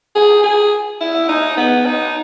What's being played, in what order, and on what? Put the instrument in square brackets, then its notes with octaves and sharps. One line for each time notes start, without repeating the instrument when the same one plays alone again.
[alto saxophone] G#4
G#4
E4
D#4
B3
D#4